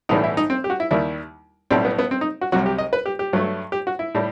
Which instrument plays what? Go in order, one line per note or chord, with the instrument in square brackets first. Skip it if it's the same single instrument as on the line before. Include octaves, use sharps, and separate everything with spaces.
[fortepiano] B1 A2 E3 G3 D#4
E4
D#4
C4
G4
F#4
E4
D#2 D#3 G3 E4
B1 A2 G3 C4
B3
B3
C4
D#4
F#4
C2 C3 F#3 F#4
G4
D#5
B4
G4
G4
G2 F#3 A3
G4
F#4
E4
A2 G3